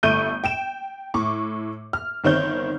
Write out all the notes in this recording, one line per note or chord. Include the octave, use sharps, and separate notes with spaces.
G1 A3 C#6 G6 D7 D#7
G5 D7 E7
A2 C#6 D6
F6
G1 D#3 C4 C#5 G6